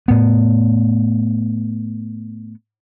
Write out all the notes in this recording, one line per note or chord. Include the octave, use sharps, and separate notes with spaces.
A2 B3